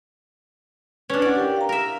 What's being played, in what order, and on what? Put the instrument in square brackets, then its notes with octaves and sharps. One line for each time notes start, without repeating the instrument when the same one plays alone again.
[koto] C#4 D4 [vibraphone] B4
[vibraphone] C#4 E4 F#5 [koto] D5
[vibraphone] G4 A#4 G5
F5 A#5
[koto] A#4 E5